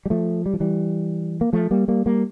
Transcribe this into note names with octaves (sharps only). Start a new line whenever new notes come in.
G3
F3 A3
G3
F3
E3 G3
A#3
F3 A3
G3 A#3
G3 A#3
G3 A#3